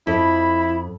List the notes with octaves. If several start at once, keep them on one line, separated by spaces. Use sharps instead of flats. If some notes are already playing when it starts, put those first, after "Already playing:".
F2 E4 B5